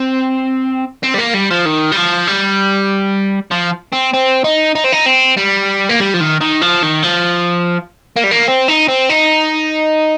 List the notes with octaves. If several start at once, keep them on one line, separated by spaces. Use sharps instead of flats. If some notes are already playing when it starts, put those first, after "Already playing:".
Already playing: C4
C4
G3
A#3
G3
F3
D#3
G3
F3
G3
F3
C4
C4
D#4
D#4
C4
D#4
C4
G3
A#3
G3
F3
D#3
D#3
F3
D#3
F3
A#3
G3
A#3
C4
D#4
C4
D#4